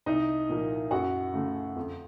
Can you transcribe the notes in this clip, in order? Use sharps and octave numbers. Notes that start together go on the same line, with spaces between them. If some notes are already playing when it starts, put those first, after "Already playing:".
C2 D#4 D#5
A#2 F3 A#3
F#2 F#4 F#5
C#3 A3
F2